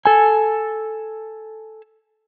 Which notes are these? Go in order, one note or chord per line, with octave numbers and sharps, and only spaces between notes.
A4 G#5